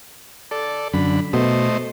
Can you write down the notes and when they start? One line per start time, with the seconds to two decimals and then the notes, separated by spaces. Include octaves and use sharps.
0.51 A4 D5
0.94 F#2 D3 B5
1.33 B2 A3 C5 D#5